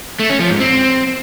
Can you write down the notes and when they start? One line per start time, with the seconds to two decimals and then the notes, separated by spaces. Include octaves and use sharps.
0.20 A3
0.30 C#4
0.40 F3
0.50 G#2
0.60 C4